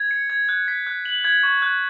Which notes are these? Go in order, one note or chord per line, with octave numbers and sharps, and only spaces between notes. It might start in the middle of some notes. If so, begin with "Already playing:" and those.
Already playing: G#6
C#7
G#6
F#6
B6
F#6
F#7
G#6
C#6
F#6